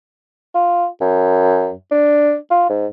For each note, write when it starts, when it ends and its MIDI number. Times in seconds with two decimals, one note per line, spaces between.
0.55 0.87 65
1.01 1.72 42
1.91 2.34 62
2.51 2.64 65
2.70 2.87 44